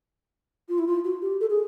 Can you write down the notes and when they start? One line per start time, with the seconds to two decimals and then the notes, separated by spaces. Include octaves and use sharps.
0.69 F4
0.79 E4
0.87 F4
1.04 F#4
1.22 G4
1.41 A4
1.49 G#4